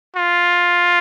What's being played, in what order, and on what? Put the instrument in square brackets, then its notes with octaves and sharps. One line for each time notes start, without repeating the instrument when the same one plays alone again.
[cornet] F4